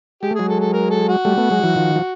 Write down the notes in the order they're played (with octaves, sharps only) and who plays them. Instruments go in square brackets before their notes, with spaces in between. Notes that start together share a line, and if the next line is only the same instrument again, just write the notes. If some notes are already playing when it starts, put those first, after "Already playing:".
[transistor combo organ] G#3 [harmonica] G4
[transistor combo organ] A3
[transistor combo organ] F#3 G#3 [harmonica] G#4
[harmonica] A4
A4
A#4
A4
F#4
[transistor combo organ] G3 A3
A3 B3
F#3 G#3
E3 F#3
D#3 F3
F3